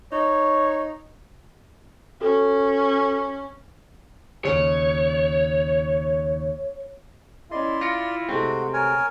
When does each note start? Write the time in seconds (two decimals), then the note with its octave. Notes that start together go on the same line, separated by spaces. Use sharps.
0.12 D#4 C#5
2.21 C#4 F#4 A4
4.45 D#2 C#3 C#5
7.51 C#4 E4 D5 D#5 C6
7.81 F4 A#6 C#7 D7
8.29 C3 G#3 A3 C4 F#4
8.73 A#4 C#5 G#5